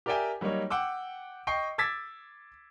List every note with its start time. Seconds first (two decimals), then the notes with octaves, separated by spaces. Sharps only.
0.06 G4 A#4 D5 E5 G5 G#5
0.41 F#3 G3 A#3 D#4 C#5
0.70 F#5 G5 D6 E6
1.47 D#5 G5 C#6 C7
1.78 D6 E6 G#6 A6 B6